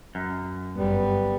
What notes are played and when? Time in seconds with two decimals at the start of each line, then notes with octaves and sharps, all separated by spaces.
0.15 F#2
0.76 G1 G3 B3